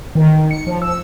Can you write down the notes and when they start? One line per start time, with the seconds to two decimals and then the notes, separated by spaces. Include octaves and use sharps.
0.15 D#3
0.51 C#7
0.67 F3
0.82 E6